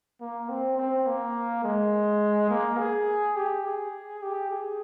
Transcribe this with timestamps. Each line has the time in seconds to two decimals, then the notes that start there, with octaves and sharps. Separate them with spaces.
0.21 A#3
0.49 C4
0.77 C4
1.06 A#3
1.64 G#3
2.50 A#3
2.78 G#4
3.36 G4
3.65 G#4
4.22 G4
4.51 G#4